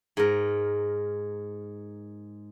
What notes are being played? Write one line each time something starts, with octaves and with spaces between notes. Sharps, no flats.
G#2 A#4